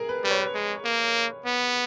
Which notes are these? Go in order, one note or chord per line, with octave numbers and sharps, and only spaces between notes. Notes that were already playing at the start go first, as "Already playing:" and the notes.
Already playing: G#4 A#4
B4
G3 B4
C#5
B4
G#3
A#3
B3